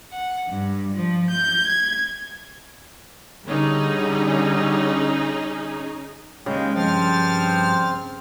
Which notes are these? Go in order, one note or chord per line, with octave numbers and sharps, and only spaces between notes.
F#5
G2
F3
G6
G#6
D3 G3 C#4 D#4 G#4
D#2 C#3 G#3 G5
G2 F3 C4 C5 F6 A6